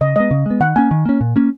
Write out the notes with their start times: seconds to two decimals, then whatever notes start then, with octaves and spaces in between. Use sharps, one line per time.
0.01 C#3 D#5
0.16 G#3 B3 D#5
0.31 C#3
0.46 G#3 B3
0.60 D#3 F#5
0.76 A#3 C#4 G#5
0.91 D#3
1.06 A#3 C#4
1.21 A#2
1.36 A#3 C#4